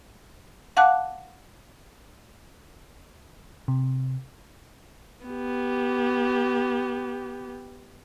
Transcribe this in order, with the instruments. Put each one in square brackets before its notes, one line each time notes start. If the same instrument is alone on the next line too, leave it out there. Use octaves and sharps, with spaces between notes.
[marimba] F5 F#5 A5 D6 F#6
[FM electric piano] C3
[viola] B3 G4